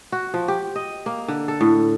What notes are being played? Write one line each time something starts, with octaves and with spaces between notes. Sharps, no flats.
F#4
F3
G4
D#5
A#3
D3
A4
A2